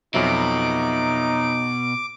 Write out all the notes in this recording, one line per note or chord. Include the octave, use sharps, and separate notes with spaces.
F2 B2 F#3 D#4 E5 D6